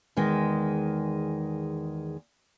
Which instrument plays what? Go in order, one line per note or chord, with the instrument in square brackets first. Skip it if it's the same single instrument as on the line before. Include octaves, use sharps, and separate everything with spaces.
[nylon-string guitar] E2 D#3 G#3